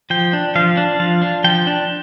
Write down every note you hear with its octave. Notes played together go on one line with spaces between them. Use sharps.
F3 G5
D4
F3 F5
D4
F3 F5
D4
F3 G5
D4